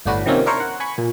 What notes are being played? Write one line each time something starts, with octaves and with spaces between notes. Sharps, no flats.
G1 A2 D4 F#4 B4
C3 D#3 F3 A#3 C4 C#4
D4 E4 A#4 C5 C#5
F#5
G#5 B5 C#6
A#2